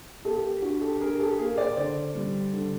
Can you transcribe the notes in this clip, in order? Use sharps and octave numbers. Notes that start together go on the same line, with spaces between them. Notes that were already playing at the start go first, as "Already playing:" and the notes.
A#3 G4 A4
G4
D4 F#4
G4 A4
D4 G#4 A#4
G4 A4
A#3 G#4 A#4
C5 D5
D3 C5 D5
G3
D3